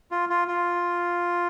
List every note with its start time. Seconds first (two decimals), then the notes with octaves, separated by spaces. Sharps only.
0.11 F4
0.29 F4
0.48 F4